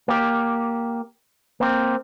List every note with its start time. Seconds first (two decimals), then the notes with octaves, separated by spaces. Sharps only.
0.08 A#3 G4
1.60 A#3 C4